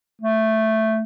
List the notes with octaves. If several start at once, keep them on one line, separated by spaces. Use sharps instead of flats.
A3